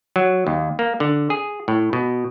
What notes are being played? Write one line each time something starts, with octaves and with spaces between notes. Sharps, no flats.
F#3
D#2
A#3
D3
G#4
A2
B2